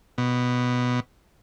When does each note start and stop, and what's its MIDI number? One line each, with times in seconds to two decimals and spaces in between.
0.18 1.00 47